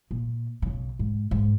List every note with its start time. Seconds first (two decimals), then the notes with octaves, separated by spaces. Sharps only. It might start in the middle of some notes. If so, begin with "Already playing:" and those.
0.11 A#2
0.62 B1 C#3
0.99 G#2
1.31 G#2